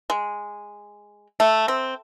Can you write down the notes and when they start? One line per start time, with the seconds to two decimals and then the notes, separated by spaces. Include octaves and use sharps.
0.10 G#3
1.40 A3
1.68 C4